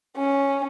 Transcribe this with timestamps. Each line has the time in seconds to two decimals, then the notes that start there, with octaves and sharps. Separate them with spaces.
0.16 C#4